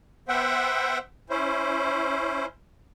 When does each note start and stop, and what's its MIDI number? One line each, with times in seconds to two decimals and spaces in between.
0.28 0.98 59
0.28 0.98 72
0.28 0.98 76
0.28 0.98 78
0.28 0.98 79
1.30 2.46 61
1.30 2.46 64
1.30 2.46 72